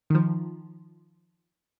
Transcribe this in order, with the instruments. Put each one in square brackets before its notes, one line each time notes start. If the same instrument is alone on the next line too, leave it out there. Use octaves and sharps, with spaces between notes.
[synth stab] D#3 F3